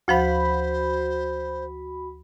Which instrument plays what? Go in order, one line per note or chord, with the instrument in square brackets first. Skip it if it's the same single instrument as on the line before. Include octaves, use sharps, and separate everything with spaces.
[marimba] D2 F3 F5 [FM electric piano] F#4 B5 [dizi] C5